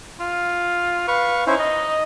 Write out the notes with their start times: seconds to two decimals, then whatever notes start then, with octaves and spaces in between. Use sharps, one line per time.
0.20 F4
1.08 B4 F5 C#6
1.47 C#4 D#4 E4 C5
1.59 D#5